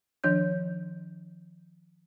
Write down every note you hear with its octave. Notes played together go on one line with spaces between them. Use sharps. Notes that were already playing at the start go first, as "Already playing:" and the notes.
D#3 F3 D4 C#5 G6